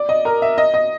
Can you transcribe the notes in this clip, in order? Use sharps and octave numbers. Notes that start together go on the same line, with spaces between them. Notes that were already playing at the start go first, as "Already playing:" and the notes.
Already playing: D5
D#5
A#4
E5
D#5
D#5